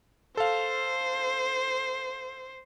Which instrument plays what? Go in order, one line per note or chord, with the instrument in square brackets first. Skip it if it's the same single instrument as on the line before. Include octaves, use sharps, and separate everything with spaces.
[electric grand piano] A4 F5 [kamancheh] C5